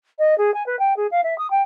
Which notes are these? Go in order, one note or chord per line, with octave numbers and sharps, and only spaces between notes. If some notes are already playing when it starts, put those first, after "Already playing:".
D#5
G#4
G#5
B4
G5
G#4
F5
E5
D#6
G5